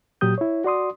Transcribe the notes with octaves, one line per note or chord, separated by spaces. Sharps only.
A#2 F#3 G4 D#6 G6
E4 C#5
F#4 D5 C6 D#6